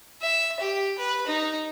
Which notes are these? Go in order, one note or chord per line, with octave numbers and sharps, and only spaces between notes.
E5
G4
B4
D#4